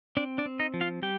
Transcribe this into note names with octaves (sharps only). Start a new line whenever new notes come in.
C4 D4 D5
D4 D5
C4
D#4 D#5
F3
F4 F5
G3 G4 G5